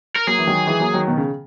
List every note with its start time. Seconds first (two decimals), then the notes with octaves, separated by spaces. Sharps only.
0.16 A#4
0.27 F#3 A#3 G#4
0.39 E3
0.47 D#3 F#3
0.67 E3 G#3
0.80 F#3 A#3
0.94 D#3 F#3
1.07 B2 D#3
1.17 C#3